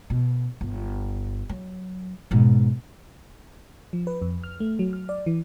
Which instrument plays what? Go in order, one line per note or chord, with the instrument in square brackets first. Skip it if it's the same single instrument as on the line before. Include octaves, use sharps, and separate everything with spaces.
[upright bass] B2
G1
F#3
G#2 B2
[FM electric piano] F3
B4
F2
F6
A3
F#3
F6
D5
E3